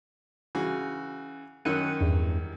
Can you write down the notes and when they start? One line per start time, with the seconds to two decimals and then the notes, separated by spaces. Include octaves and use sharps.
0.55 C#3 E3 F#4
1.65 F#2 D#3 C#4 F#6 C#7 D#7
2.00 E2 G2